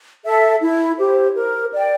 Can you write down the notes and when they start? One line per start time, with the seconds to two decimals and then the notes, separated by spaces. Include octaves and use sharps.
0.24 A4 E5
0.61 E4
0.98 G4 C5
1.35 A#4
1.73 D5 G5